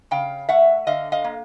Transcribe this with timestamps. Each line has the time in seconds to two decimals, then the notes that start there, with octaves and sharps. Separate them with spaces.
0.11 C#3 F5 G5
0.49 A3 E5 F#5
0.87 D3 D#5 F5
1.12 D#5 F5
1.24 A#3